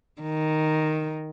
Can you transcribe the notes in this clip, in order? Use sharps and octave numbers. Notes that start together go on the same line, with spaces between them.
D#3